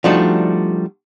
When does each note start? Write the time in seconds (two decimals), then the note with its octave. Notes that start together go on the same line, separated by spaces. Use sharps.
0.04 F3 G3 A3 D4 D#4 F#4